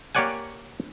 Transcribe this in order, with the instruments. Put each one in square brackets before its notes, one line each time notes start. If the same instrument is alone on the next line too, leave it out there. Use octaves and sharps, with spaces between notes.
[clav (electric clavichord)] A#3 G4 C#5 D5 F#5 G#5